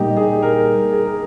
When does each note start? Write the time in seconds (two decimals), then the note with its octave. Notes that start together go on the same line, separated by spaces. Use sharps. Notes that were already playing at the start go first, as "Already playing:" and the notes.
Already playing: A#2 G3 A#3 D4 D#4 G4
0.17 G#4
0.42 A#4
0.92 G#4
1.06 A#4